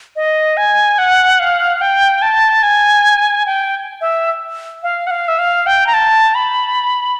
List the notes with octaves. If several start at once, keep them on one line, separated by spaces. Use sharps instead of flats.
D#5
G#5
F#5
F5
G5
A5
G#5
G5
E5
F5
F#5
F5
E5
F5
G5
A#5
A5
B5